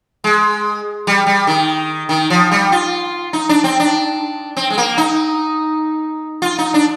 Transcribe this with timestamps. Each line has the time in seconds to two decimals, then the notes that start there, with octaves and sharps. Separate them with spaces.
0.24 G#3
1.07 G3
1.27 G3
1.47 D#3
2.09 D#3
2.30 F3
2.51 G3
2.72 F4
3.33 D#4
3.49 D4
3.64 C4
3.80 D4
4.57 C4
4.70 G#3
4.78 A#3
4.98 D#4
6.42 F4
6.59 D#4
6.74 D4